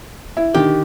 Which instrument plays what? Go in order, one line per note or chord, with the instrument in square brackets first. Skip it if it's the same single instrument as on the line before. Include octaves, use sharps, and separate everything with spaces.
[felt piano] E4
[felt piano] D3 D#3 [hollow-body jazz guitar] G4